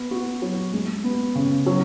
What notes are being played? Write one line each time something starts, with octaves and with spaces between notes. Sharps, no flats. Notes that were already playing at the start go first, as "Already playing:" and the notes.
Already playing: B3
F#4
F#3
G#3
B3
C#3
F#3